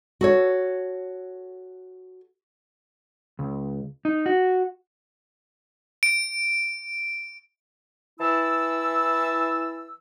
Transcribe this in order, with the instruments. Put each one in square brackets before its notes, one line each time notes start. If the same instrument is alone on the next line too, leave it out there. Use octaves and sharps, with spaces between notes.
[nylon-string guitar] F#4 A4 C#5
[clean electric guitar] C#2
D#4
F#4
[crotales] D7
[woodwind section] E3 E4 A5 E6